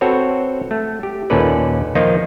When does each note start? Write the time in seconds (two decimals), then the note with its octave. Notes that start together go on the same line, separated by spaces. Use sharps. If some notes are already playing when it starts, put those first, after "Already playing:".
0.01 C4 F#4 A4 B4 C#5
0.71 A3
1.03 G4
1.30 D#2 A#2 C#4 A4 B4 D5
1.95 D#3 F3 A#3 D#4 F4